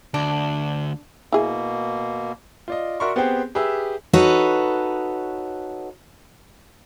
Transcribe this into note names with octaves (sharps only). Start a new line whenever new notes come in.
D2 D4
B2 A#3 E4 G#4 G#5
F4 D5 D#5
F#4 A#4 D5 E5 C6 C#6
B3 C4 G4 G#4 C5 G5
G4 G#4 B4 E5 E6
D#4 F#4 A4 B4 C#5